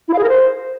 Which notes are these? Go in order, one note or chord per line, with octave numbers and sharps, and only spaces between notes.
E4
F5
G#4
A#4
C5